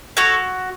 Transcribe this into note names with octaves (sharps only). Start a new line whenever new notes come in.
F#4 A4 C#5